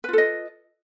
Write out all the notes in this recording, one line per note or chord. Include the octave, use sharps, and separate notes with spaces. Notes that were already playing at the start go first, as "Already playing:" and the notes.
F4 A4 B4 D#5